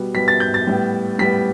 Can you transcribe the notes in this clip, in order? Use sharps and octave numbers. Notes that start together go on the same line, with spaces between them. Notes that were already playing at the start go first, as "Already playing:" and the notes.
Already playing: B2 G3 B3
B2 G3 B3 B6
A6
G6
A6
A2 G3 B3
A2 G3 B3 B6